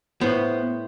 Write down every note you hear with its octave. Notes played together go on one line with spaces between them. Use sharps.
A2 B3 C5